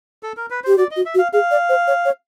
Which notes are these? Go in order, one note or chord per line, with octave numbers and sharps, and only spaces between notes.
A4
A#4
B4
G4 C5
F#4 D5
D#5
F#4
E5
F#4
F5
G#4 F5
D5
C5
C#5
C#5